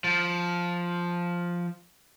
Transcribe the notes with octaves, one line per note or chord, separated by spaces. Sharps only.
F3